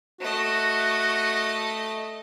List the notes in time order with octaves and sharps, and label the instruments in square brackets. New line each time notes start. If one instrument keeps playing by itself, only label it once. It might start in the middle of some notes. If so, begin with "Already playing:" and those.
[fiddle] A3 D#5 [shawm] F#4